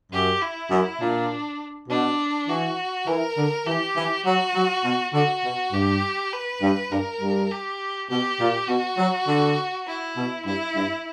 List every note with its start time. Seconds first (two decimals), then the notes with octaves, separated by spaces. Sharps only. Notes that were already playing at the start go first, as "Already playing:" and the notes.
0.12 F#2 G4
0.41 E4
0.70 F#2
1.01 A#2 D4
1.89 B2 D4
2.48 E3 F#4
3.07 E3 A#4
3.37 D3
3.66 E3 G4
3.96 E3
4.25 F#3 F#4
4.55 F#3
4.84 B2
5.14 D3 F#4
5.44 B2
5.73 G2 G4
6.33 B4
6.62 G2
6.91 G2 A#4
7.21 G2
7.51 G4
8.10 B2 G4
8.40 A#2
8.68 B2 F#4
8.98 F#3
9.28 D3
9.87 E4
10.17 B2
10.46 G2 E4
10.76 G2